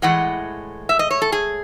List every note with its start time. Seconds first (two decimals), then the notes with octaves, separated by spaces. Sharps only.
0.02 A2 E3 G#3 F#5
0.89 E5
0.99 D#5
1.11 C#5
1.22 A4
1.32 G#4